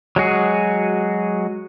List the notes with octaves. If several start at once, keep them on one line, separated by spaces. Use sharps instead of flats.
F#3 G#3 F#4 G#4